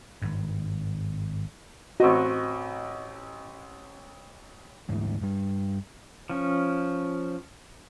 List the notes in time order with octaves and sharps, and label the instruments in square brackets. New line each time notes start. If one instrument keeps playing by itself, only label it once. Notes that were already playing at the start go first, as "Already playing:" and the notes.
[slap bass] G#1 G2
[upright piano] A1 C4 D#5 [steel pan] F#4
[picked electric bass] D2 G#2 E3
G2 G3
[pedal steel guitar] F3 C#4